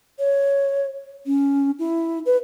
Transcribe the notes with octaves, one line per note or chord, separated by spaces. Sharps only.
C#5
C#4
E4
B4